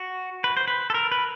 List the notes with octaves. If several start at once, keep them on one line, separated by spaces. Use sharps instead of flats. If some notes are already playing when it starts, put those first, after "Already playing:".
Already playing: F#4
B4
C5
B4
A4
A#4
B4